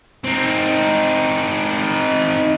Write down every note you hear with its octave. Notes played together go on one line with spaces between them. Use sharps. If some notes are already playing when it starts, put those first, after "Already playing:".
C4 D#4